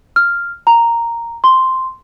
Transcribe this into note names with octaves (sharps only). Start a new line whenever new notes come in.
F6
A#5
C6